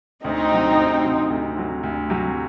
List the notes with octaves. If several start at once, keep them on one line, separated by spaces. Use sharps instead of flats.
D2 C4 D#4
C3 F#3
D2
C3 F#3
D2
C3 F#3
D2
C3 F#3